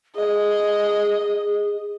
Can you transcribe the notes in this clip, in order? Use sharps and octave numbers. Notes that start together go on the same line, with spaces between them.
G#4 D#5